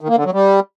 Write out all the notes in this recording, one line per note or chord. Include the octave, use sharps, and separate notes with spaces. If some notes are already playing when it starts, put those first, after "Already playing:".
D#3
A#3
D3
F#3
G3